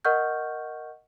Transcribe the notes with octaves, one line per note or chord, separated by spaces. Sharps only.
A#4 D#5 F#5 C#6 F6 G6